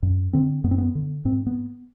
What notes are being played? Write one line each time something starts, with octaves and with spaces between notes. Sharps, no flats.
F#2
D3 C4
F#2 B3
C4
B3
D3
G#2 C4
B3